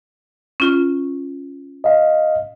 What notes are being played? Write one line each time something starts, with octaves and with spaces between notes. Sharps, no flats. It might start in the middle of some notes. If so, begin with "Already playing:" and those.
C#4 F4 C#6
D#5 F5